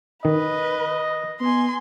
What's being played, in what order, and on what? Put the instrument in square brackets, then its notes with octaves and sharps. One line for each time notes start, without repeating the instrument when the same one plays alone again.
[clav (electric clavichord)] D#3 [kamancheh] B4 [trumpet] D#5
[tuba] B3 [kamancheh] G#5 C6